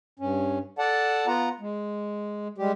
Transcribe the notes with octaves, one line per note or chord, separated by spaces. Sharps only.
G2 C#4
A4 D5 F#5 A5
B3 F4 F#5 A#5
G#3
G3 G#3 G4